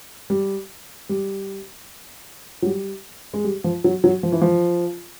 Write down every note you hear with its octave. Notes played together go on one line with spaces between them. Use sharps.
G3
G3
F#3
G3
G#3
G3
F3
F#3
F#3
F3
E3
F3